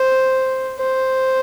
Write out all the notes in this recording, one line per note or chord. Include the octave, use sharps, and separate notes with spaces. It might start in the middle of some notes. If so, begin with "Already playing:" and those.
Already playing: C5
C5